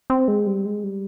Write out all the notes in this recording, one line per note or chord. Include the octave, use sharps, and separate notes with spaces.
C4
G#3
G3
G#3
G3